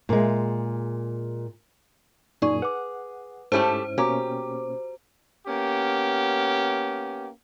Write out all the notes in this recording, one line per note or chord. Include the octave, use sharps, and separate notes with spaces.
A#2 G#3
F#2 A#2 D#4 G#4 D5 C#6
B4 F#5 D6
G#2 A3 C#4 E4 G4 A4 C5
B2 A#3 C#4 F#4 G4 A#5 D6
A#3 B3 C#4 G4